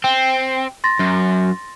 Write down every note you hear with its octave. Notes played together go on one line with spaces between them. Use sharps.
C4 G5
C6 A6 A#6
F#2